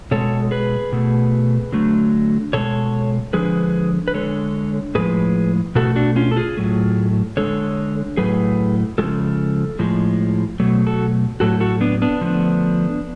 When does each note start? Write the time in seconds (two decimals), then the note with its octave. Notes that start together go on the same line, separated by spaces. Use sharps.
0.11 B2 G#3 A4 C#5
0.51 G#4 B4
0.92 B2 A3
1.72 D3 F#3 A3
2.53 B2 G#3 A4 C#5
3.33 D3 F3 G#3 G#4 B4
4.08 B4
4.14 D3 G#3 A4 C#5
4.95 A2 F3 G#3 G#4 B4
5.75 B2 A3 F#4 A4
5.96 D4 F#4
6.16 C#4 F4
6.31 A4
6.37 F4 G#4
6.57 A2 F#3 A3
7.37 D3 G#3 A4 C#5
8.17 A2 F#3 A3 G#4 B4
8.98 C#3 F3 G#3 F#4 A4
9.79 A2 F3 G#3
10.60 B2 F#3 A3
10.87 F#4 A4
11.40 A2 F#3 A3 F#4 A4
11.60 F#4 A4
11.81 B3 D4
12.02 B3 D4
12.21 D3 F3 A3